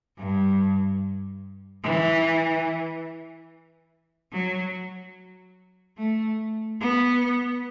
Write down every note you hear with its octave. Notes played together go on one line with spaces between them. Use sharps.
G2
E3
F#3
A3
B3